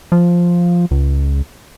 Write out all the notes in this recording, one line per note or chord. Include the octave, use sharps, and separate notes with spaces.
F3
C#2